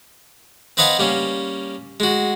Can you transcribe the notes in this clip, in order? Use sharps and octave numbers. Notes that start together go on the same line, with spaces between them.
C4 B4 D#5 F5 F#5 G#5
G3 A#3 C#4
G#3 F#4